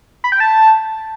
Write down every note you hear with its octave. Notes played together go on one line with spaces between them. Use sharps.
B5
G5
A5